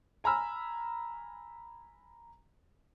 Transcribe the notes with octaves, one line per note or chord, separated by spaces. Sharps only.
G#5 A#5 B5 E6 F6